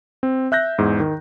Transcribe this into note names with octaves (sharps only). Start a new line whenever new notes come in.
C4
E5 F#6 G6 A#6
E2 G#2
D#3